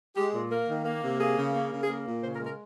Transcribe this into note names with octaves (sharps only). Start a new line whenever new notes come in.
G#3 G4
A#2
A#3 A#4
D#3
A#3
C3
A#3 G#4
C#3
A#3
C#3
G#4
A#3 A#4
A#2
C#3 C5
A#4
G#3
A#4